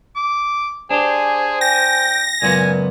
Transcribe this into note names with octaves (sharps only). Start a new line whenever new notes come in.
D6
D4 G4 G#4 C5 G#5
G5 A#6
C#2 F#2 A#2 B3 G#5